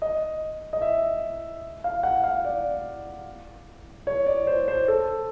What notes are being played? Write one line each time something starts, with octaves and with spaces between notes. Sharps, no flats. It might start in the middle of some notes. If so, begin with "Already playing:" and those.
D#5
D#5
E5
F5
F#5
F5
D5
C#5
D5
C5
C5
A4